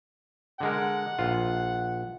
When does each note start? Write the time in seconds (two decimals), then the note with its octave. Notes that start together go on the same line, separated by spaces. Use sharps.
0.61 D3 G#3 A#4 F#5
1.19 A#1 F4